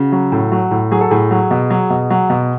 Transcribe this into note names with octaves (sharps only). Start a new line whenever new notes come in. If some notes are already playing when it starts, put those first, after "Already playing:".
Already playing: C#3 F#4
F#3
A2
F#3
A2
F#3 G#4
A4
A2 G#4
F#3
B2
F#3
B2
F#3
B2